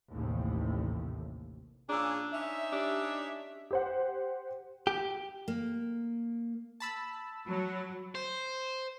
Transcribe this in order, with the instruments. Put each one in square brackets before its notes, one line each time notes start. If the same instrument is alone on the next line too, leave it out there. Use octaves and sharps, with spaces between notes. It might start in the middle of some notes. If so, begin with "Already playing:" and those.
[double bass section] A1 D#2 C3
[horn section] A#2 C#4 G#4 [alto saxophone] D4 [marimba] A#5 D6 E6
[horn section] C#4 D#4 E5
[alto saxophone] D4 [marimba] G4
[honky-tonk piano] G4 C5 F#5
[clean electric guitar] G4
[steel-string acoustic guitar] A#3
[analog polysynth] A5 B5 E6
[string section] F#3
[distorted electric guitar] C5